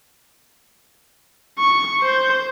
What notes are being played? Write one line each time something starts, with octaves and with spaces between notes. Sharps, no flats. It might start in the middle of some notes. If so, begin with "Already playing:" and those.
C#6
C5 G6